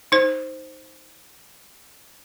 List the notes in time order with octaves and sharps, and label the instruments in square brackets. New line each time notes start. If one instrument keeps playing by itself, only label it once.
[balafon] D#4 C5